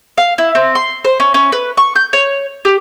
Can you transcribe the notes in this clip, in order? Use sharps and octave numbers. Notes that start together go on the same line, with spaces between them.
F5
E4
C4
C6
C5
C#4
C#4
B4
C#6
G6
C#5
G4